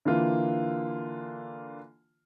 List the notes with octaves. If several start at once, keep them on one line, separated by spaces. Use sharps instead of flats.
D3 E3 A#3 F4